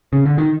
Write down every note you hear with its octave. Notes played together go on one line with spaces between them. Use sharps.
C#3
D3
D#3